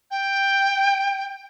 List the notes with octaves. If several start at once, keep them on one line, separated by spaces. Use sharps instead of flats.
G5